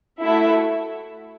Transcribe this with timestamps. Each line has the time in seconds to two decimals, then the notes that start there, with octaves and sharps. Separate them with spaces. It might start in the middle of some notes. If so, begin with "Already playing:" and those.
0.22 A3 E4 F#4 A4 E5